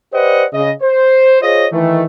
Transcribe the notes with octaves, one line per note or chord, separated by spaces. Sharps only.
G4 B4 C5 D5 D#5 F#5
C#3 D#5
C5
F4 G#4 C5 C#5 D#5
D#3 E3 A3